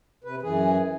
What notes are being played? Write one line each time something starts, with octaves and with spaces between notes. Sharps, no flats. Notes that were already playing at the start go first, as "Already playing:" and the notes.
C3 B4
F#2 E3 G#4